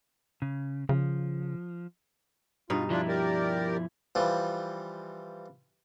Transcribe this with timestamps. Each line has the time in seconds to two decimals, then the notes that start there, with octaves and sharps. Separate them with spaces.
0.42 C#3
0.89 C#3 F3
2.70 G2 B2 D#4 F4
2.90 F3 D4 E4 F4
3.08 G4 A#4 D5
4.15 E3 F3 G3